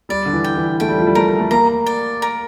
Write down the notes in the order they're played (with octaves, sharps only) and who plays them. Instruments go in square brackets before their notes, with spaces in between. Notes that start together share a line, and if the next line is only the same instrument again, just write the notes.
[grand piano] G3 [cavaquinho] D5
[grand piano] D3
E3
[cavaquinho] G5
[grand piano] E3
[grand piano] A3 [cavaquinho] G5
[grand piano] G3
F3
G3
[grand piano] A3 [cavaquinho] A#4
[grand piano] A3
[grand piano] A#3 [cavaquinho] A#5
[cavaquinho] D5
A#4